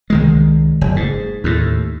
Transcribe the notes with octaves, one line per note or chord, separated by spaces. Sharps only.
C2 D#3 G#3
F#1
G#2
D#2 A2